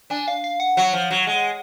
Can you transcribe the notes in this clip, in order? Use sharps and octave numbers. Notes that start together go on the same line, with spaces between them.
D4 G#5
F5
F5
F#5
F#3 F#5
F3
F#3
G#3